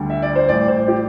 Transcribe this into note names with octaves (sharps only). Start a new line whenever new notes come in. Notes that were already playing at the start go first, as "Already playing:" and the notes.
Already playing: D2 D3 G3
E5
D5
C5
A1 A2 G3 D5
C5
G4